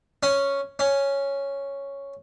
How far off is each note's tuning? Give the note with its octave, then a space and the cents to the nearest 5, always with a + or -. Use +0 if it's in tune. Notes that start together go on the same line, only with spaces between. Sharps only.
C#4 +0
C#4 +0